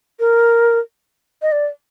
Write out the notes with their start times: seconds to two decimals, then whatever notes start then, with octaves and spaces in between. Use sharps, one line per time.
0.20 A#4
1.42 D#5
1.52 D5